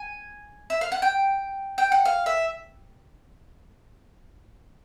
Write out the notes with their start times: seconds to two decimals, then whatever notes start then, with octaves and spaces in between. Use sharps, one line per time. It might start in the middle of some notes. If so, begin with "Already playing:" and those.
Already playing: G#5
0.70 E5
0.81 F5
0.92 F#5
1.02 G5
1.78 G5
1.92 F#5
2.05 F5
2.26 E5